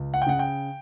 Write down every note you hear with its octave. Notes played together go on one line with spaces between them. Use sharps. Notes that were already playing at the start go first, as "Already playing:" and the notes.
Already playing: C#2
F#5
G5
C#3 F#5
G5